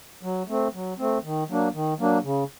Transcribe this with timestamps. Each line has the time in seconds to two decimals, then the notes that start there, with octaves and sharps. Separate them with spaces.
0.23 F#3
0.48 A3 C4
0.74 F#3
0.98 A3 C4
1.24 D#3
1.49 F#3 A#3 D4
1.74 D#3
1.99 F#3 A#3 D4
2.24 C#3